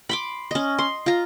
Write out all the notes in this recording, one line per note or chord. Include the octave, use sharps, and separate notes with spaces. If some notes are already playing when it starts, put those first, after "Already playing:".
B5 C6 D6
C#4 D#5
C6
F4 A#5